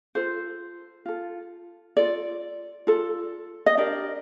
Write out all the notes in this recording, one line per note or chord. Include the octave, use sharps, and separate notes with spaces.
F4 A4 C5
F4 A4
F4 A4 D5
F4 A4
D#5
D4 G4 A#4 D5